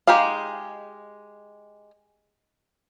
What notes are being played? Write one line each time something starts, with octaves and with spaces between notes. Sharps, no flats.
G#3 D#4 G4 G#4 F5